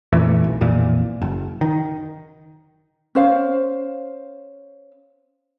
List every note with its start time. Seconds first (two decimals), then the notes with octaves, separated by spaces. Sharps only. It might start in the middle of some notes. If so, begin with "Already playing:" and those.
0.13 F2 A#2 E3 A3
0.44 B1
0.61 B1 F2 A#2 E3
1.22 F#1
1.61 D#3
3.15 C#4 C5 F5